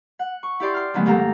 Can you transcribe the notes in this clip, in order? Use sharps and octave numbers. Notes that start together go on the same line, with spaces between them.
F#5
C#6
E4 G4 D5 C6
C6 F6
D3 D#3 F#3 G#3 A3 B3
G#2 D#3 A#3 G4 A4 A#5